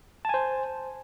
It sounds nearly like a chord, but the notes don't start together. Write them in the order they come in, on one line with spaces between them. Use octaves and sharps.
A5 G#5 C5